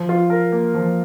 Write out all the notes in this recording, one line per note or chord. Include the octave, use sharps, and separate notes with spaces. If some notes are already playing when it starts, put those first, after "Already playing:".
Already playing: F3
F4
A#4
A#3
F3